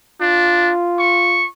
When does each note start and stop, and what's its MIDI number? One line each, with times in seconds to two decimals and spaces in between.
0.21 0.72 62
0.21 1.46 65
0.99 1.48 85